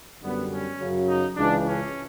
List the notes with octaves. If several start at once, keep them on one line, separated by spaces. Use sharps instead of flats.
F#2 D3 G3 B3
C#4
F#2 C#3 F#3
D#4
C#2 C#3 E3 D4
C#4